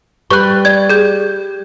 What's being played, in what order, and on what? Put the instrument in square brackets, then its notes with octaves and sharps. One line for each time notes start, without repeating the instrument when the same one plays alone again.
[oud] G3 B4 [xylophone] C#6 F#6
[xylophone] D5 G#6
G#4 G6